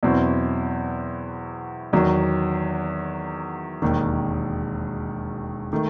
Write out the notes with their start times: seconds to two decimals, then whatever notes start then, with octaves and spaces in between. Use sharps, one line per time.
0.03 E2 B2 F#3 C4 E4
1.93 E2 D#3 F#3
3.82 E1 D#2 D#3
5.73 D#3 A3